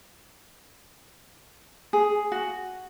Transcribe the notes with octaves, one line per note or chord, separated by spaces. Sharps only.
G#4
F#4